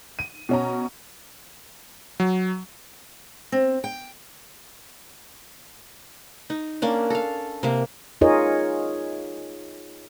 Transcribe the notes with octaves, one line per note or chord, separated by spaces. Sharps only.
D#7
B2 C#4 A#5
F#3
C4
G5
D#4
A#3 C#4 D4
A4 F5
C3 A#3
D#4 F4 G#4 A#4 C#5 D#5